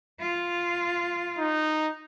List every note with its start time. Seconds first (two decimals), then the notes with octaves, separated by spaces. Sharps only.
0.20 F4
1.38 D#4